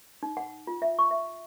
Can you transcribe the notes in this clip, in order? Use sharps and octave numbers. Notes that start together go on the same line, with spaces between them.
D#4
F#5
F4
E5
C#6
E5